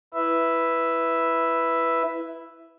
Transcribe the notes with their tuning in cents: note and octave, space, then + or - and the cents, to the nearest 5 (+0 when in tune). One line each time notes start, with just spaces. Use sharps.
E4 +0 B4 +0 E5 +0